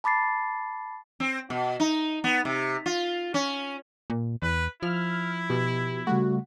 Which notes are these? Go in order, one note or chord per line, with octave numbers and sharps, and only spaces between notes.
A5 B5 D6 A6 C7
C4
B2
D#4
B3
C3
F4
C#4
A#2
E2 B4
F3 E4 F6
B2 G4
C#3 G3 A3 F#4